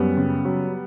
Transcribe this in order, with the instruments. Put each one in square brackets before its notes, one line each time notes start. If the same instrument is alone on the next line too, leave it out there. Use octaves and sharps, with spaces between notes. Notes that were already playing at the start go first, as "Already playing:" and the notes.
Already playing: [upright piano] F#2 G3 B3
C#3
F#3